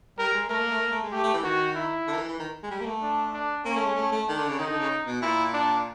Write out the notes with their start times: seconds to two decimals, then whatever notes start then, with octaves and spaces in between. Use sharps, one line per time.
0.18 G3 A#4
0.33 G#3
0.49 A3 A#4
0.59 A#3
0.71 A3
0.81 A#3
0.91 A3
1.03 G#3
1.12 A3 G4
1.23 A3
1.34 E3
1.43 D#3 F#4
1.75 E4
2.07 D3
2.12 D#3
2.17 E3
2.28 E3
2.39 D#3
2.63 G#3
2.71 G3
2.80 A#3
2.86 A3
3.02 D4
3.33 D4
3.65 A#3 C#4
3.75 A3
3.85 G#3
3.96 A3
4.12 A3
4.27 D#3 D4
4.39 D3
4.48 C#3
4.59 D#3 D#4
4.69 D3
4.80 C#3
5.06 B2
5.22 A#2 E4
5.53 D4